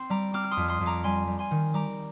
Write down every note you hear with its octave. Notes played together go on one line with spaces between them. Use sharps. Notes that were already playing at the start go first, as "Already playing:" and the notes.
Already playing: C4 C6
G3 A#5 D6
C4 D6 F6
F6
C6 D#6
F2
C6 D#6
F2
A#5 D6
G3 G#5 C6
G3
G#5 C6
D#3
G3 A#5 D6